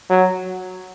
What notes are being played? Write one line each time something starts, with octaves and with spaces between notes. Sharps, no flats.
F#3